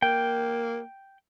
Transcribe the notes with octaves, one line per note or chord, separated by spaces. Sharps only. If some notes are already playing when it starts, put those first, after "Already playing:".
A#3 G5